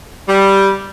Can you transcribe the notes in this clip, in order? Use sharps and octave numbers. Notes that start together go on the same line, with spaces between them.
G3